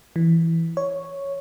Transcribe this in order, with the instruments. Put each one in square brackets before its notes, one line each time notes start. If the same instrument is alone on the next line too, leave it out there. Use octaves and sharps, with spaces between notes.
[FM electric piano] E3
C#5